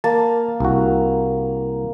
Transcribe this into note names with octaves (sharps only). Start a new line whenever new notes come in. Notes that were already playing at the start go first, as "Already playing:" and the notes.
A#3 A5
C2 F#4